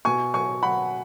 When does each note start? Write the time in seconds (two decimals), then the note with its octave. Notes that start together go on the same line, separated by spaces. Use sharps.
0.05 B2 G#5 C#6
0.34 F#3 G#5 C#6
0.63 F#3 F#5 B5